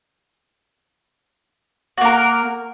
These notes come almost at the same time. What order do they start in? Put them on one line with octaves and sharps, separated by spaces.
F#4 A#3 A#4